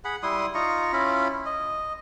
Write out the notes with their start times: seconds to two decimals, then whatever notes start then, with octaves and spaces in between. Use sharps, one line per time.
0.05 G#4 F#5 B5
0.23 G3 E4 C6 D#6
0.55 D#4 F4 A#5 C#6
0.93 C#4 E4 F4 B5
1.46 D#5